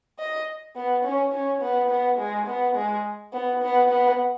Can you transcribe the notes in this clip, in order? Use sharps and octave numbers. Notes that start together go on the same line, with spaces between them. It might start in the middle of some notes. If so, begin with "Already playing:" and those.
D#5
B3
C#4
C#4
B3
B3
G#3
B3
G#3
B3
B3
B3